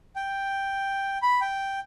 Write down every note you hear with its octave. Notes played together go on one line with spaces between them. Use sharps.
G5
B5
G5